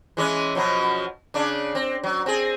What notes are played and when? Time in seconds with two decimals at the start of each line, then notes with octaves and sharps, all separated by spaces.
0.17 E3 G#3 C#4
0.55 B2 F3 F#3
1.34 C#3 D4
1.75 C4
2.04 F#3
2.26 C4 G#4